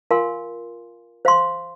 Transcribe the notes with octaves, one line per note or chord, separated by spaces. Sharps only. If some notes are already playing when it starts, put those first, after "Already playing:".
F4 A#4 F5 G#5 C6
C5 F5 C6